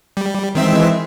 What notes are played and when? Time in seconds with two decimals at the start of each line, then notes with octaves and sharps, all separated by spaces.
0.17 G3
0.55 D#3 E3 G#3 C4 E5